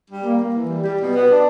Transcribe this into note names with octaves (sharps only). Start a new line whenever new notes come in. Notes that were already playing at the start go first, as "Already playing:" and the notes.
G3
A#3
A#3
E3
G3
G3
B2
B3
D4